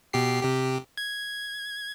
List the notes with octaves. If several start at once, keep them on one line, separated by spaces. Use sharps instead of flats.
B2 G4 C7
C3 G4
G#6